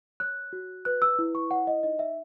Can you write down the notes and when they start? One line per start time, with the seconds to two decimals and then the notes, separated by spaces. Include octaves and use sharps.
0.20 C#5 F#6
0.53 F#4
0.85 B4 F#6
1.02 E6
1.19 E4
1.35 C#6
1.51 C#5 F#5
1.67 D#5
1.83 D#4 D#5
1.99 E5